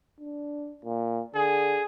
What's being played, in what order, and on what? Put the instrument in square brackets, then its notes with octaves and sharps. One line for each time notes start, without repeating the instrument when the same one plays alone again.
[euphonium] D4
A#2
[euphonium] D3 [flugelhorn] G#4